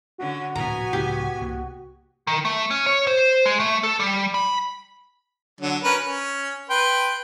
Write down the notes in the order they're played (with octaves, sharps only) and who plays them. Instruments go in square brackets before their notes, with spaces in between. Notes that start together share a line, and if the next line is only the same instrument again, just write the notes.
[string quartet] D3 C#4 [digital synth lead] F#4
[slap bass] D1 A#1 C3 [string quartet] B3 G#5 [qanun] A#5
[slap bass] C#2 A2 [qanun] G4
[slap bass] C2 A#3
[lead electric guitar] D#3
A3
C#4
C#5
C5
G#3
A3
A4
G3
B5
[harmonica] D3 F#3
C#4 A#4 B4
C#4
B4 G5 C6